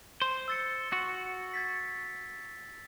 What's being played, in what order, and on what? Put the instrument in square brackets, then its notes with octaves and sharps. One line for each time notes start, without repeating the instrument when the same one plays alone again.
[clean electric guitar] C5
[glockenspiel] E6 A6 C#7
[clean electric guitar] F#4
[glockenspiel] G#6 A6 B6